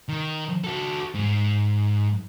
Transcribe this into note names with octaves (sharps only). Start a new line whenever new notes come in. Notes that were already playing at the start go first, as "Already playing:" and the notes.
D#3
F#4 A4
G#2